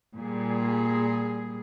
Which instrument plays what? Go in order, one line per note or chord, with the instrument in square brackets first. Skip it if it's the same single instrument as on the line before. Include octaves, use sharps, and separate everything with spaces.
[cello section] A#2 G3 G#4